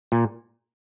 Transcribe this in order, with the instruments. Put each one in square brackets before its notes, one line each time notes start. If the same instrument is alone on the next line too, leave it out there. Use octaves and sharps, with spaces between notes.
[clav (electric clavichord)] A#2